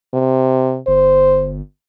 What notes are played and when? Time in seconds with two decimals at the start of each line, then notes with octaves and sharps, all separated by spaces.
0.14 C3
0.87 G1 C5